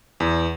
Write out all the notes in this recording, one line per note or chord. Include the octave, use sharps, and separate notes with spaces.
E2